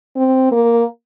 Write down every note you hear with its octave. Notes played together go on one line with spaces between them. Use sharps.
C4
A#3